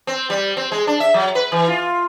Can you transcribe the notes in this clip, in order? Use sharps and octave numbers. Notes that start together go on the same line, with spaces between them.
C4
G3
C4
G#3
D4
E5
F#3
B4
E3
F4